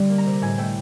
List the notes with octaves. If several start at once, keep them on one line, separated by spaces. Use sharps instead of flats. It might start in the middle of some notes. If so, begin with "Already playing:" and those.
Already playing: D3 G3
A#3
A#5
C3
A2 G#5
A3 G5